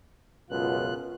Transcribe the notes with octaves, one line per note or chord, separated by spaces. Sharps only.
C#2 F#2 B2 F4 F#6